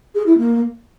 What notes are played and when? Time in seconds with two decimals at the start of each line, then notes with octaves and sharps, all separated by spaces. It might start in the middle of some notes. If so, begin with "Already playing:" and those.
0.15 G#4
0.26 E4
0.38 A#3